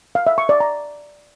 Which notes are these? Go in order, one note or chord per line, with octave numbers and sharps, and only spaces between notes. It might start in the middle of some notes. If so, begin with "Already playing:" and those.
F5
E5
C#6
D5
A#5